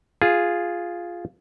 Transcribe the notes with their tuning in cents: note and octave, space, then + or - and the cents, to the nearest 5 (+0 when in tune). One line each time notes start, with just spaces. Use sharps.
F4 +0 G#4 +0